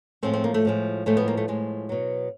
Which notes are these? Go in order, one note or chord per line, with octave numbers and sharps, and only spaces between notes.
A2 F3 G#3 C4
C4
A#3
A3
A2 F3 G#3
A2 F3 G#3 A3
B3
A#3
A3
A2 F3 G#3
B2 F#3